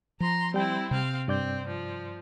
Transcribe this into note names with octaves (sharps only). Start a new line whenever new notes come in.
F3 A#5 C6
G3 C4 E4 G5
C3 C4 F5
G2 C4 D5 G6
F3